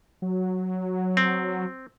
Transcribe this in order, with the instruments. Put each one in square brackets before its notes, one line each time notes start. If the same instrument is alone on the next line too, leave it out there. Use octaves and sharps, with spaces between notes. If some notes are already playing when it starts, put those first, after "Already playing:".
[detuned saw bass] F#3
[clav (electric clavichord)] C4